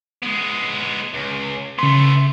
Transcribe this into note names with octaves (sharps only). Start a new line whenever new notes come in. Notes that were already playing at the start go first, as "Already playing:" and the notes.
G#3 B3
C#2
C#3 A3 B3 C6